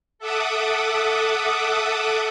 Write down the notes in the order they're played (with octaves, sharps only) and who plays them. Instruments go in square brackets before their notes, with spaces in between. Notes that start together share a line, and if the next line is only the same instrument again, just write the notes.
[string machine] A4 E5 F#5 D6 D#6